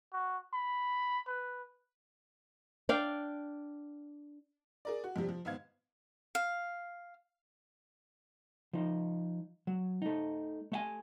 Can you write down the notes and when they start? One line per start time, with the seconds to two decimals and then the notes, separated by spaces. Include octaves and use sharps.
0.13 F#4
0.53 B5
1.27 B4
2.89 D4 D5 F5 G5
4.85 G#4 A#4 D5
5.04 F#4
5.16 F2 C3 F3 G3
5.29 F3
5.45 G#1 B3 F5 G#6
6.35 F5
8.73 F3 D#4
9.67 F#3
10.02 A3 D#4
10.72 A3 E5 G#5